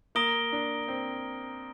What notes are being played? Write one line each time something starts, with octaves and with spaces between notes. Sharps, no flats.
A#3 A#5 D#6 A#6 D7 G7
D4
C4